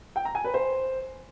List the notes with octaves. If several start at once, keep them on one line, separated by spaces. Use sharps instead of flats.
G5
A#5
G#5
B4
C5